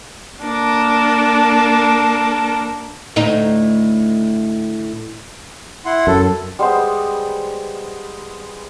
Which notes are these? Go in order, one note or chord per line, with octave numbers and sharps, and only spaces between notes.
A#3 D4 A4 A#4
D2 A2 D#4
E4 F#5 C6
F#2 A4
G3 G#3 B3 C5